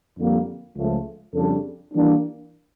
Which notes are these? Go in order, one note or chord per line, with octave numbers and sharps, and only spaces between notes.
F2 D3 G3 A#3
C#2 C#3 F3 A3
F2 C#3 G3 D4 A4
E3 G3 A#3 D4